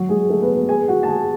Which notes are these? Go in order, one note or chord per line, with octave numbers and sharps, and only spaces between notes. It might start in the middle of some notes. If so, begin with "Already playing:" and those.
Already playing: F#3 F#4
G#3 G#4
A3 A4
B3 B4
B3 B4
G#4 G#5
F#4 F#5
A5
G#4 G#5